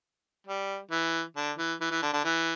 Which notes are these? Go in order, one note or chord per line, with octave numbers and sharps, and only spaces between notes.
G3
E3
D3
E3
E3
E3
D3
D3
E3